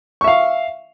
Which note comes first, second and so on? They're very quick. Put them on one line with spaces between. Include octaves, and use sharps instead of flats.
C#6 E5 F5